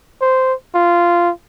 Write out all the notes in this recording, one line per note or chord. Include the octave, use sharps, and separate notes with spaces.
C5
F4